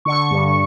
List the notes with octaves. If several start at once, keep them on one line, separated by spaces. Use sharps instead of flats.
D3 C#6
G2